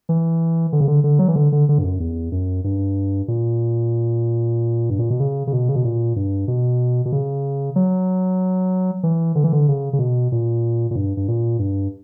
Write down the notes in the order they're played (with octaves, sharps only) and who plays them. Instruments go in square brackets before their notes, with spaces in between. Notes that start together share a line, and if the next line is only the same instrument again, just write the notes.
[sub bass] E3
D3
C#3
D3
D3
F#3
E3
D3
D3
D3
G2
F#2
E2
F#2
G2
A#2
G2
A#2
B2
C#3
C#3
B2
C#3
B2
A#2
G2
B2
B2
C#3
F#3
E3
D3
E3
D3
C#3
C#3
B2
A#2
A#2
G2
G2
A#2
G2